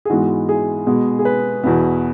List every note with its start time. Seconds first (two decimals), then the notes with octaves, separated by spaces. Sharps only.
0.05 G#4
0.09 G#2 E3 G#3 B3 F#4
0.49 G#4
0.87 B2 G#3 B3
1.19 G#4
1.25 B4
1.64 E2 B2 B3